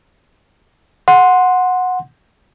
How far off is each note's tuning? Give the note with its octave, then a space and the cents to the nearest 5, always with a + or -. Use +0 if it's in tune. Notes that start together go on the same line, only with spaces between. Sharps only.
F#5 -15 C6 +0